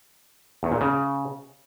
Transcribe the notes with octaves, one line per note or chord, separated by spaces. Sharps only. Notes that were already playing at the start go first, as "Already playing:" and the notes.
E2
A#2
C#3